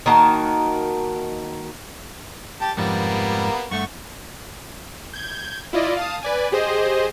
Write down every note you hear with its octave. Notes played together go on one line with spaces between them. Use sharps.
D#3 A#3 F#4 A5
G4 G5 A5
F2 G#2 F3 G3 A#3 B3
G2 A3 F#5 C#6
G6 G#6
E4 F4 D5 D#5
F5 A5 D#6
B4 D5 G#5
G4 G#4 C5 D#5